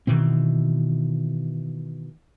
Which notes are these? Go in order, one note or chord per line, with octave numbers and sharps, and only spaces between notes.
B2 D#3 E3 C4